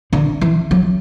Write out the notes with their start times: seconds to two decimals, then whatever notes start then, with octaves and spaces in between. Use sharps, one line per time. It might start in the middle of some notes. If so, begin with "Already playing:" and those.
0.13 D3
0.41 E3
0.71 F#3